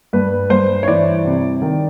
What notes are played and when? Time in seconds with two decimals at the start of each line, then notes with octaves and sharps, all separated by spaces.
0.13 G2 B4
0.50 G2 C5
0.83 C#5
0.88 E3 D5
1.25 C3
1.62 D#3